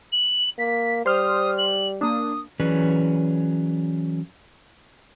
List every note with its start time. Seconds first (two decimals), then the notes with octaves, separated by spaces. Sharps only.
0.12 F#7
0.58 A#3 B6
1.06 G3 C5 D#6 F6
1.58 F#7
2.01 A#3 D4 D#6
2.60 E3 F#3 C#4 G#4 B4 D5